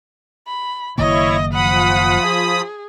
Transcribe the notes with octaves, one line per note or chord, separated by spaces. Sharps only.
B5
F#1 D#3 A#3 E4 C#5 D#5
F3 F#5 B5 D#6
G#4